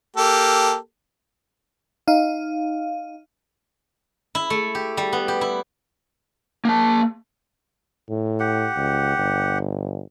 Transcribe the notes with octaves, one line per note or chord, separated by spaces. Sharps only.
A#3 G4 A4
D#4 F5
E4
A3
G4
G3
B3
G4
E4
A#3 A5
A2
G4 F#5
C#2
G1